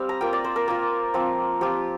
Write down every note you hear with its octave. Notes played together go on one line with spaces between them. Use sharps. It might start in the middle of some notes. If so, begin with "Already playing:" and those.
Already playing: G3 C4 F5
A#5
A#3 F4 G5
D5
C5
A#4
A#3 F4
F3 C4 F4
F3 C4 F4 G4